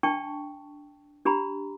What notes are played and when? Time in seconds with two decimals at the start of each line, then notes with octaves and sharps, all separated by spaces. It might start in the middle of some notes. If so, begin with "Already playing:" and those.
0.03 D4 G5 A5 C#6
1.25 D4 G4 A#5 B5